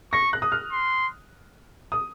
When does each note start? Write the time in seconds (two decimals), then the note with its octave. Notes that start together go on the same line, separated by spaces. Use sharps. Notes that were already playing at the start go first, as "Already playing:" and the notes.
0.13 C#6 A#6
0.33 F#6
0.42 D#6
0.52 F6
0.72 C6
1.92 D#6